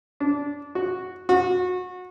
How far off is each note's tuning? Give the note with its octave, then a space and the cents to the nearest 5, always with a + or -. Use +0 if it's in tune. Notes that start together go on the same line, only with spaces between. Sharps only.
D4 -20
F#4 -5
F#4 -30